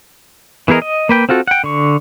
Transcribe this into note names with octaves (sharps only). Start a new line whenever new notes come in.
E3 B3 G#4 A#4 D#5
D#5
A#3 B4 G5
C4 F4 F#4 A4
F#5 G5
D3 C#6